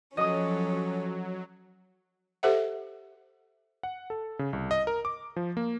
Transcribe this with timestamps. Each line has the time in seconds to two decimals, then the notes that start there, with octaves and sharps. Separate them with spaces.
0.17 F3 F#3 C#4 A4 D#5 D#6
2.43 G4 A4 C5 E5 F#5
3.83 F#5
4.10 A4
4.39 C#3
4.53 C2
4.71 D#5
4.87 A#4
5.05 D6
5.36 F3
5.57 A#3